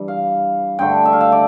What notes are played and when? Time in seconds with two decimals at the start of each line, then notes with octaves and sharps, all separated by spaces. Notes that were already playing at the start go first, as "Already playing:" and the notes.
Already playing: G2 E3 G3
0.08 F5
0.79 G2 D3 A3 G5
1.05 E5
1.13 F5
1.21 E5
1.32 D5